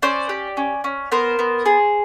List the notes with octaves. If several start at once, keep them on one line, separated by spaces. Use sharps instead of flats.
C#4 C5 D5
G4
C#4
C#4
B3 A#4 C5
B3
G#4